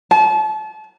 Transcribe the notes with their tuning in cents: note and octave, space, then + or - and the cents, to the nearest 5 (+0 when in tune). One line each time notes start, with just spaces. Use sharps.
A5 -35